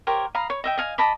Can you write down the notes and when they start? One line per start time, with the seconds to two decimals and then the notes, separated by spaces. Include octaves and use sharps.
0.07 G4 A#4 C5 C#5
0.35 F5 A#5 B5 D#6
0.50 C#5
0.64 D#5 E5 G5
0.77 D#5 F5 G#5
0.98 D#5 A5 B5 D6